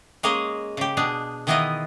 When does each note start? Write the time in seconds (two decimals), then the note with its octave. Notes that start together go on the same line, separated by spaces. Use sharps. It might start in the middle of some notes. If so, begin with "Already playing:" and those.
0.23 G#3 A#3 C#4 G#4 D#5
0.77 C#3 G4
0.97 B2 D4 G#4
1.47 D#3 E3 B3 E4 F4 D#5